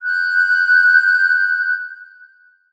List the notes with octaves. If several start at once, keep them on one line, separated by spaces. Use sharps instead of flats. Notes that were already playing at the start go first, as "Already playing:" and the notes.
F#6 G6